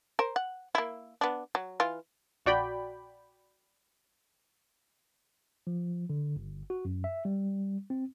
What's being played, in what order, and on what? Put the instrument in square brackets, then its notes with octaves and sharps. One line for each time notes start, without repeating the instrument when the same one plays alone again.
[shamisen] A#4 C5
F#5
A#3 E4
B3 D4
F#3
E3 F4
[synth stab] A#1 F#4 D5 G5 B5
[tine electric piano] F3
D3
G1
F#4
F#2
E5
G3
C4